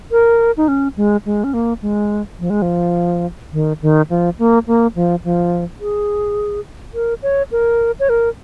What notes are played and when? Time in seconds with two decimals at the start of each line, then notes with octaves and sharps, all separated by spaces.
0.11 A#4
0.57 D#4
0.68 C#4
0.97 G#3
1.26 G#3
1.44 C#4
1.54 A#3
1.82 G#3
2.40 F3
2.50 G#3
2.62 F3
3.53 D#3
3.82 D#3
4.10 F3
4.39 A#3
4.67 A#3
4.96 F3
5.24 F3
5.80 G#4
6.94 A#4
7.23 C#5
7.52 A#4
8.00 C#5
8.09 A#4